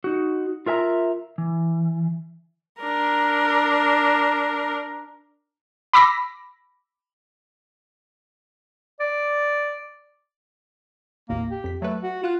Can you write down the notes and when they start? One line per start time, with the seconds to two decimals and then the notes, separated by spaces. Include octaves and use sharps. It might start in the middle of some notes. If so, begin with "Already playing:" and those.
0.04 D#4 F#4
0.66 F4 A#4 E5 G#5 A#5
1.38 E3
2.81 D4 A#4
5.93 B5 D6 E6 A#6 B6
9.00 D5
11.29 G#1 D#2 A2 A#3
11.51 G4
11.64 F2 B6
11.82 F#3 A3 B4
12.03 F#4
12.23 F4 F#6 E7